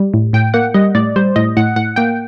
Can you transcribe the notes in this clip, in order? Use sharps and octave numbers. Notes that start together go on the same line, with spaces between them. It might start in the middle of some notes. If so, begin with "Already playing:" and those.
Already playing: G3
A2
A2 G5
A#3 F#5
G3 D#5
A2 D5
G3 C5
A2 D#5
A2 F#5
A2 F#5
A#3 G5